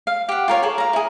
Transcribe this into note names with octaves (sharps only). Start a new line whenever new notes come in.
F5
G4 F#5
F4 A#4 C#5
G#4 A4
F5 A#5
E4 G#4